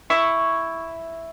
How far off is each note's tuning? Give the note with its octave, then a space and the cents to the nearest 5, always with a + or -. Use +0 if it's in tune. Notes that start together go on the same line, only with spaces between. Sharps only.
E4 +0 C#6 +0